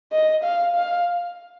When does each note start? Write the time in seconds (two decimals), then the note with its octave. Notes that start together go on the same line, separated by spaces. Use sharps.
0.12 D#5
0.43 F5
0.75 F5